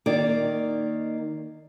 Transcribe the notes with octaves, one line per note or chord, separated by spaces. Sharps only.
D#3 A#3 D#4 D5